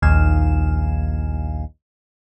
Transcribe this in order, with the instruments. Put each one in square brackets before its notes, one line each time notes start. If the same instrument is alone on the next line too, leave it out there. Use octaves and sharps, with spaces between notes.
[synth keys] A#1 D#2 D#4 F5 G#5 E7